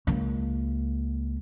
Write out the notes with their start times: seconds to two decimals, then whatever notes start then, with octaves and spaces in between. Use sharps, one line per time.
0.07 C#2 A#3